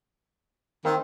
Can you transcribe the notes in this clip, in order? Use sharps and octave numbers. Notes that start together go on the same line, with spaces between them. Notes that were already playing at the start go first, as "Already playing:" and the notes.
D#3 A#3 C4